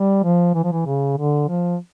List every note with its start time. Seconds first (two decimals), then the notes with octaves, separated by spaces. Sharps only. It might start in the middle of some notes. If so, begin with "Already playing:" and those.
Already playing: G3
0.24 F3
0.55 E3
0.64 F3
0.72 E3
0.86 C#3
1.17 D3
1.48 F3